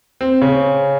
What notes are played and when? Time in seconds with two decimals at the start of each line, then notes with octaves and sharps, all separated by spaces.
0.21 C4
0.42 C#3